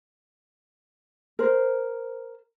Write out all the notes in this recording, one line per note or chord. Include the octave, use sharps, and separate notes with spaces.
A#4 C5